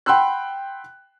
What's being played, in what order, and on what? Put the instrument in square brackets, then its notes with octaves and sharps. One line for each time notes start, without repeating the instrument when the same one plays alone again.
[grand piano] F#5 G5 B5 C6 E6 F#6